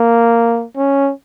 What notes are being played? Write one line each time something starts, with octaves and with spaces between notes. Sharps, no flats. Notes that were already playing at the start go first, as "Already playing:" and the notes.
Already playing: A#3
C#4